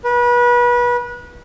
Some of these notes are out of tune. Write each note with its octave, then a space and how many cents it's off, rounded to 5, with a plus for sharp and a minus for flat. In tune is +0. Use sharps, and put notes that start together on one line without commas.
B4 -30